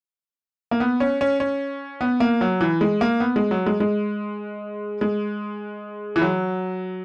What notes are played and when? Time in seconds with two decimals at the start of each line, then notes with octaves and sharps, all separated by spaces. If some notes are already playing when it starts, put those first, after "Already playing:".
0.71 A#3
0.80 B3
1.00 C#4
1.21 C#4
1.40 C#4
2.01 B3
2.20 A#3
2.41 F#3
2.61 E3
2.81 G#3
3.01 A#3
3.20 B3
3.36 G#3
3.51 F#3
3.66 G#3
3.80 G#3
5.01 G#3
6.16 E3
6.22 F#3